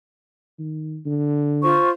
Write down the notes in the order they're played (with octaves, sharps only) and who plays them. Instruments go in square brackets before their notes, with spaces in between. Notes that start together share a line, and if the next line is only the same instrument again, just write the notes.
[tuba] D#3
D3
[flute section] F4 C5 C#6